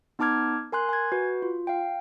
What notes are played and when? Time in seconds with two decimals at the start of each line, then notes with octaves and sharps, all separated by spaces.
0.19 B3 D#4 A5 D6 F6 G#6
0.72 A#4 G#5 C6 F#6
0.89 G#5 G#6
1.12 F#4 B4
1.42 F4
1.67 F5 G5